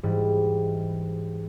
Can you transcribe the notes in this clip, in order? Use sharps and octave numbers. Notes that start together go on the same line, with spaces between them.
G#2 E3 G3